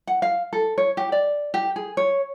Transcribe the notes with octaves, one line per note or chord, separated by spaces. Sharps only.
F#5
F5
A4
C#5
G4
D5
G4
G#4
C#5